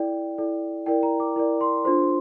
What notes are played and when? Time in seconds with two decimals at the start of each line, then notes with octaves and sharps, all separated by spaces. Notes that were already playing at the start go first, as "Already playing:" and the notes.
Already playing: E4 A4 D5 G5
0.38 E4 A4 D5
0.86 E4 A#4 D5 G5
1.03 A#5
1.20 D6
1.36 E4 A#4 D5
1.61 C6
1.85 D4 F4 A4 C5 C6